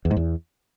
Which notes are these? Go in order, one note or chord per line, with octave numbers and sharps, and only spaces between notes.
E2
G#2
E2